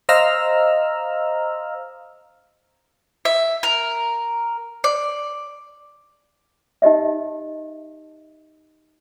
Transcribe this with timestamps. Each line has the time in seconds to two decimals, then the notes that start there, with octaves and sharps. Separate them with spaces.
0.09 C5 D#5 F5 A#5 E6 F6
3.25 E5
3.63 A#4
4.84 D5
6.82 D#4 G4 D#5 E5